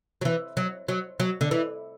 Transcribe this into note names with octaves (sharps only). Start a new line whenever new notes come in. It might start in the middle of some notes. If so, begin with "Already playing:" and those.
F#3
E3
F#3
F#3
F#3
D3
E3